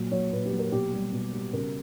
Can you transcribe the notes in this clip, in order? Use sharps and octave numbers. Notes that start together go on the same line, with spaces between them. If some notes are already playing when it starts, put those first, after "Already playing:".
Already playing: A#2 F#3
F#3 C#5
A#2 B4
G4
F#3
A#4
B2 G4
G3
B2
G3
C#3 A#4